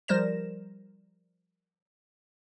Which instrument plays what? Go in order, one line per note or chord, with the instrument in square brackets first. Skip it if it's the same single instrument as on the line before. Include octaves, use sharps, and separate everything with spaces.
[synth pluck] F3 G3 A#4 C5 A#6 E7